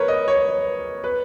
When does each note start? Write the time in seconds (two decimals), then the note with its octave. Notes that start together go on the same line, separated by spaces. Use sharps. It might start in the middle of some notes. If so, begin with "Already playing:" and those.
Already playing: A#4 B4 C#5
0.08 D#5
0.28 C#5
1.04 B4